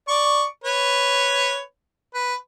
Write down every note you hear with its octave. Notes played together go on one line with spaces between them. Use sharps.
D5 C#6
B4 C#5
B4